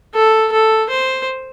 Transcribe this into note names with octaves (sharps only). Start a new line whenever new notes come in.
A4
A4
C5